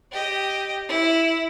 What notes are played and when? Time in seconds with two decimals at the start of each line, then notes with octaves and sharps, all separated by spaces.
0.12 G4 D#5
0.89 E4